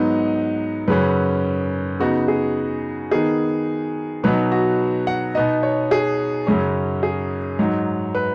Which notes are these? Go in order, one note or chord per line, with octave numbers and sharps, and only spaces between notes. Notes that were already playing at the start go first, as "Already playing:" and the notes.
Already playing: G#2 F#3 B3 D#4 D#5
F#2 C#3 F#3 C#4 B4
C#3 B3 D#4 F#4
G#4
D#3 B3 D#4 G#4
B2 F#3 B3 D#4 B4
F#4
F#5
B2 B3 D#4 D#5
C#5
G#4
F#2 C#3 F#3 C#4
G#4
G#2 F#3 D#4
B4